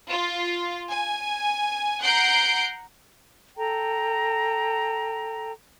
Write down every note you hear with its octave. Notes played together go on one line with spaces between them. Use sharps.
F4
G#5
F#5 A#5 G6 C7 D7
A4 G5 A#5